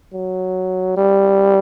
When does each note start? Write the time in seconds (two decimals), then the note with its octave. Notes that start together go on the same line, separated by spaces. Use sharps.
0.14 F#3
0.97 G3